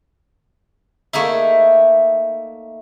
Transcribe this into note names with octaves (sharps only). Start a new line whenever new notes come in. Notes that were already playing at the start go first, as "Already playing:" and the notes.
A3 A#3 D#4 E4